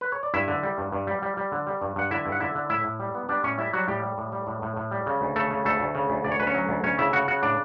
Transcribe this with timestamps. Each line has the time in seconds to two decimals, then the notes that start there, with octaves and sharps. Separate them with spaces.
0.01 B4
0.12 C#5
0.23 D5
0.34 G2 E4 E5
0.48 D3
0.63 G3
0.78 G2
0.92 G2
1.07 G3
1.22 G3
1.37 G3
1.52 D3
1.67 G3
1.82 G2
1.96 G2 F#5
2.11 D3 E4 E5
2.26 G2
2.32 F#5
2.40 D3 E4 E5
2.55 D3
2.70 A2 E4 E5
2.85 A2
3.00 G3
3.15 B3
3.29 G3 D4 D5
3.44 A2 C#4 C#5
3.58 G3 E4 E5
3.73 F#3 G3 F#4
3.88 A2 G3 G4
4.03 G3
4.18 A2
4.32 G3
4.47 A2
4.62 A2
4.76 A2
4.91 G3
5.06 C#3
5.21 D2
5.36 C#3 A3 A4
5.51 C#3
5.65 D2 A3 A4
5.80 D2
5.95 C#3
6.10 D2
6.24 D2 D5
6.32 C#5
6.40 D2 B4
6.47 C#4 C#5
6.54 F#3
6.69 D2
6.84 D2 C#4 C#5
6.98 C#3 E4 E5
7.13 C#3 F#4 F#5
7.28 C#3 F#4 F#5
7.43 A2 D4 D5